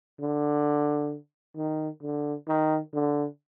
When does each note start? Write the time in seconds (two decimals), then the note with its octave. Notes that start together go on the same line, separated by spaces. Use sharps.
0.20 D3
1.57 D#3
2.02 D3
2.48 D#3
2.94 D3